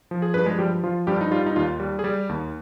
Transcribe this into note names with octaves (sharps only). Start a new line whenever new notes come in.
F3
G#4
G2 B4
G#3 G#4
F3 G3 G4
F3 F4
G2 G3 G4
D#4
G3 F4
D#4
D#2 F4
G3
G#4
G3 G4
D#2